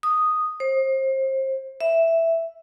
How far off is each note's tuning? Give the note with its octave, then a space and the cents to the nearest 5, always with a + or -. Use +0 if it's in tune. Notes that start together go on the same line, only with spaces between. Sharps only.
D#6 -5
C5 +30
E5 +0